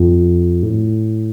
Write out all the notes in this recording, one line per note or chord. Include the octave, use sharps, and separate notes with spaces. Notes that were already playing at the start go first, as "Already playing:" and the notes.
Already playing: F2
A2